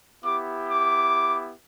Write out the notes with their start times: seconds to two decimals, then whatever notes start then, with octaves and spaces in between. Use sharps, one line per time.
0.24 B3 E4 G4 D6
0.70 D6